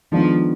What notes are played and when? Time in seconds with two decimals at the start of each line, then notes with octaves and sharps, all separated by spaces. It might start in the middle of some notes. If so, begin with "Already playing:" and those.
0.12 D#3 F3 G#3 B3 D4